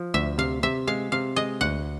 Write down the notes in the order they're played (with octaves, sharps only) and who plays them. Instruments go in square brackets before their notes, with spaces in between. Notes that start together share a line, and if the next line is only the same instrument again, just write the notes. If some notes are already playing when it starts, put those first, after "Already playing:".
Already playing: [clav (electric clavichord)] F3
[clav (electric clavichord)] D2 [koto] E5
[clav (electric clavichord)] C3 [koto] F5
[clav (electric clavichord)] C3 [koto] E5
[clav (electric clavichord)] G#3 [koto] F5
[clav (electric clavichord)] C3 [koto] F5
[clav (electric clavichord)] G#3 [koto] D#5
[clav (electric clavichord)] D2 [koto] F#5